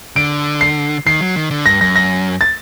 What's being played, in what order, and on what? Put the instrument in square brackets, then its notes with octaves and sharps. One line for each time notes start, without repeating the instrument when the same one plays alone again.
[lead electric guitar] D3 [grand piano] D7
[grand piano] C7
[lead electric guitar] D#3 [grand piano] C7
[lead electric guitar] F#3
D#3
D3
[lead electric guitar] G2 [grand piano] A#6
[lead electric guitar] F#2 [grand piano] A#6
[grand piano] A#6
A6